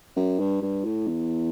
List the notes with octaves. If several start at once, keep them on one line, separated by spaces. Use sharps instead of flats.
F#2
G2
G2
A2
E2